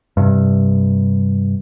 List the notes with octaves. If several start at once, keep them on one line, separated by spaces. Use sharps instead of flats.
G2 C3